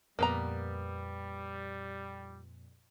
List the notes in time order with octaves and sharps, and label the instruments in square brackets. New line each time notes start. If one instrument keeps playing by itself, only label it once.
[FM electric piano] F2 A#2 [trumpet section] G3 [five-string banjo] A#3 B3 A#5